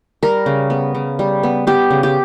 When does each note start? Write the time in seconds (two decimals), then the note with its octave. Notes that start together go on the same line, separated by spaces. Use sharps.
0.23 G3 A#4
0.46 C#3
0.70 B3
0.95 C#3
1.19 G3
1.43 B3
1.67 B3 G4
1.91 C#3
2.03 G4